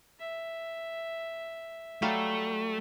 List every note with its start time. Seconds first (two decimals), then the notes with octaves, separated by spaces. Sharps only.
0.19 E5
2.02 F#3 G3 A3 F5